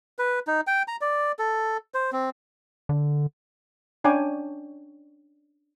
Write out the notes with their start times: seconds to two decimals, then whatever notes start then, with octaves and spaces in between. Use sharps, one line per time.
0.19 B4
0.47 D#4
0.67 G5
0.88 A#5
1.01 D5
1.39 A4
1.94 C5
2.12 C4
2.89 D3
4.04 C#4 D4 C#5 G5 G#5 D6